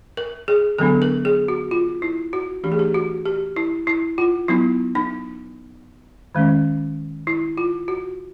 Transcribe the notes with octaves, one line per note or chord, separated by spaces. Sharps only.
A#4
G#4
D3 F#3 B3 D4 A4
A#4
G#4
F#4
F4
E4
F#4
E3 A3 D4 G4
G#4
G4
F#4
G4
E4
E4
F4
F#3 B3 D#4 E4
D#4
D#3 G#3 C#4
E4
F4
F#4